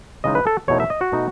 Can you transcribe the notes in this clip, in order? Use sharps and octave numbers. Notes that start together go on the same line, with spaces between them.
C#3 E3 G#3 D#4 D#5
B4
A4
E2 B2 A3 D#4 C#5
E5
D#5
F#4
B2 A3 D#4